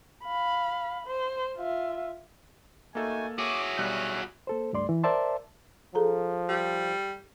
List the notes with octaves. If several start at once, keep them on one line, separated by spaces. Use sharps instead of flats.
F5 B5
C5
F4 E5
A3 A#3 D#4 F#4 A4 G#5
F#4 G#4 C#5 E5 D6
B1 G3 F6 F#6
A#3 A4 C5
C#2 G2 A3 D5 C6
E3
A#4 C5 D5 E5 A5 C6
F3 G#4 A4 A#5
G3